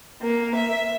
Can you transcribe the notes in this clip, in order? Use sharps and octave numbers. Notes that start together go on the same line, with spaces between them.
A#3
E5